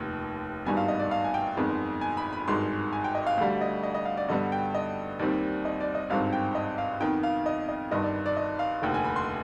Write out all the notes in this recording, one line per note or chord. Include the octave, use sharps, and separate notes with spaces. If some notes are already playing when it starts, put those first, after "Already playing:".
Already playing: F1 D#2 D#3
G#1 G2 D#3 G3 B3 G#5
F5
D#5
D5
F5
G#5
G5
G1 F2 D#3 G#3 B3
G#5
B5
B5
G#1 G2 D#3 G#3 C6
G#5
G5
D#5
F5
D2 D3 G3 F5
D#5
D#5
D#5
F5
D5
G2 D3 G3 B3 D#5
G5
D#5
D#2 D#3 G3 C4 D5
D#5
D5
D#5
G#1 G2 D#3 G#3 C4 F5
G5
D#5
F5
F2 D#3 B3 G5
F5
D#5
D#5
G1 G2 D#3 D#5
D5
D5
D#5
F5
F1 D#2 D3 G5
G#5
B5
C6